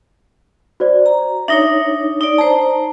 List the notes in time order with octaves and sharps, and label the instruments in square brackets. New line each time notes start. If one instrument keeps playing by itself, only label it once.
[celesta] F#4 C5 D5
[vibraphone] A#5
[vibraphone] D4 D#4 C#5 [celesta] E5 A#6
[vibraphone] D#4 D5
[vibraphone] C5 A#5 [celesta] A5